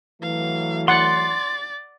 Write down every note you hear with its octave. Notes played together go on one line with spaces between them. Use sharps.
E3 F#3 A3 F5
D5 F#5 C6 A6